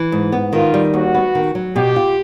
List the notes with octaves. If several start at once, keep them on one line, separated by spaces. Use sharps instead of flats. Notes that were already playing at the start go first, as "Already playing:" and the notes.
Already playing: E3
G#2
B3
D#3 F4
G3
D#2 F#4
B3
D#3
F#3
B2 G4
F4